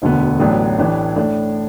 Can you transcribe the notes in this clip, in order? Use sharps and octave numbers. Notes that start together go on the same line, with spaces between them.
E1 D2 D3 B3
A1 A2 F#3 B3 D4
A1 A2 E3 D4
A2 A3 D4